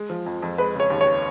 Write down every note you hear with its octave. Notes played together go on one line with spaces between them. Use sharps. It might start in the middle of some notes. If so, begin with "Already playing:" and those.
Already playing: G#3
F3
F2
F2
G#3 B4
C#3 C#5
D#2
C#5